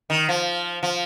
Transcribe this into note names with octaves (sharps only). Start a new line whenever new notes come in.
D#3
F3
F3